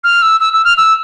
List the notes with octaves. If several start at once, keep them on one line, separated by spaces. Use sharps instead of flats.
F6
E6
E6
E6
F6
E6